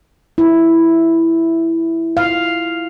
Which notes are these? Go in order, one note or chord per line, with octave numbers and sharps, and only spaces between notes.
E4
F5